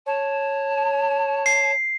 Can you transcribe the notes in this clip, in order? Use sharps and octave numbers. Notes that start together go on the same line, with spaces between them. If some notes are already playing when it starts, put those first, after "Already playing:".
C#5 A5
C7